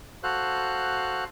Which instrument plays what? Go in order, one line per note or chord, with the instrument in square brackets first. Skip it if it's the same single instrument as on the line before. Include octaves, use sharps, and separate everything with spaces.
[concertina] F#4 A4 C5 F5 F#6